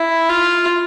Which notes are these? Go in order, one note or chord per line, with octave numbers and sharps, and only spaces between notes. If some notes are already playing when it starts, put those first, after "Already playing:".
Already playing: E4
F4